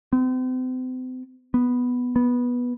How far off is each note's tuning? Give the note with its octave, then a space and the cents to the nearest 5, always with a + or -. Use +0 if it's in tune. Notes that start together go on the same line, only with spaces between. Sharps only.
C4 -40
B3 +0
B3 -10